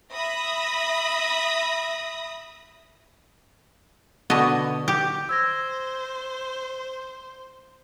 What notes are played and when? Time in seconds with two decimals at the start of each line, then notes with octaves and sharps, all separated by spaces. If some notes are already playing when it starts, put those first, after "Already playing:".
0.14 E5 B5 D#6 A#6
4.30 B2 D3 B3 F#4 D#5
4.88 G4
5.29 C5 E6 G#6 A#6